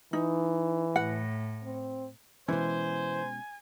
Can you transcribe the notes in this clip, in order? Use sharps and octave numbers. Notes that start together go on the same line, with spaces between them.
E3 D#4
A2 F#5
C4
B2 E3 G#3 C#4 C5 G#5